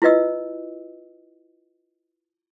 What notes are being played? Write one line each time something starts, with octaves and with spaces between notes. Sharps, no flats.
E4 F4 B4 D#5 E6